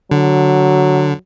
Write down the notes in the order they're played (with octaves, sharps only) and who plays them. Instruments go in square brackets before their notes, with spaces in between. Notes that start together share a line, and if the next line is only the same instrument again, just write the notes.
[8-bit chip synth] D3 [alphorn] F#3